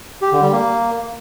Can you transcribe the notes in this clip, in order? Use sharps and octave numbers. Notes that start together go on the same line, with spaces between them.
G4
D3
G3
A#3